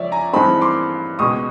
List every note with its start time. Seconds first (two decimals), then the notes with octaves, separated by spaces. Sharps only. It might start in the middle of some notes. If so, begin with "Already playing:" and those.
Already playing: C#2 F3 C#5 D5 E5
0.12 G#5 A#5
0.33 G2 E3 G#3 C4 D#4 A5 B5
0.61 C6 D6
1.19 C#2 B2 G#3 C#6 D#6